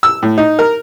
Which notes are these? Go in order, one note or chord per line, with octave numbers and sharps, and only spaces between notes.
E6
A2
D#4
A#4